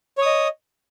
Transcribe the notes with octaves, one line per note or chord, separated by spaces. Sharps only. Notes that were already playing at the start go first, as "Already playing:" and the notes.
C#5 D#5 D#6